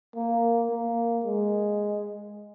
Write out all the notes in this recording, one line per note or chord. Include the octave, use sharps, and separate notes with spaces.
A#3
A#3
G#3